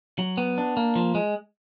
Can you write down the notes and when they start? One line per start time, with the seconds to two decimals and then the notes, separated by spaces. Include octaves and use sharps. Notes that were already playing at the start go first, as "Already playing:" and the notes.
0.19 F#3
0.37 B3
0.58 D4
0.77 A#3
0.96 F3
1.15 G#3